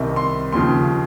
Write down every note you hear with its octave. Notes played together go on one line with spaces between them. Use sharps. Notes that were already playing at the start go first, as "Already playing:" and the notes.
Already playing: C2 C3 D#3
C6
D#2 C#3 F3 C6